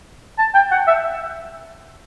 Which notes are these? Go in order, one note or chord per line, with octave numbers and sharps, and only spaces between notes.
A5
G5
F#5
E5